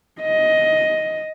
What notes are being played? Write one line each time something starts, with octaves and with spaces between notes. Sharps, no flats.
D#5